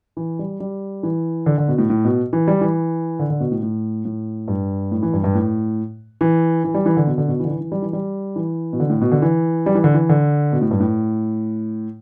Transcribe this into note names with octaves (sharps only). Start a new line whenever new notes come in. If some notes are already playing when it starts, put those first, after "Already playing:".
E3
G3
G3
E3
D3
D3
B2
A2
A2
B2
E3
G3
E3
D3
D3
B2
A2
A2
A2
G2
A2
E3
G2
G2
A2
E3
E3
G3
E3
D3
B2
D3
B2
E3
D3
E3
E3
G3
E3
G3
E3
B2
D3
A2
B2
D3
E3
G3
E3
D3
E3
D3
B2
A2
G2
A2